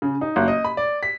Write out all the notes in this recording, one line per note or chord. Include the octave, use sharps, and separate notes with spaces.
C#3
D#4
F#1
D#5
B5
D5
B6